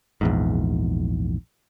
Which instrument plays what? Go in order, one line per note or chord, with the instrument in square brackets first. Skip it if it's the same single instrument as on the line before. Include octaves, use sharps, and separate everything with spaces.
[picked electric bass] A#1 E2 G#2